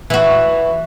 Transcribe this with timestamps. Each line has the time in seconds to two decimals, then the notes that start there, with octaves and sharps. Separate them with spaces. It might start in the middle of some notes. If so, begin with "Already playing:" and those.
0.10 E3 F#4